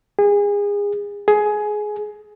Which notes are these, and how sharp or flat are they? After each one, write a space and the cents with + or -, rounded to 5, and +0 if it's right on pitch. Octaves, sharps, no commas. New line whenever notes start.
G#4 -30
G#4 +15